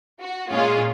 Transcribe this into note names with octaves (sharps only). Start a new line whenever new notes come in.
F#4
A#2 G#3 C#4 F4 G#4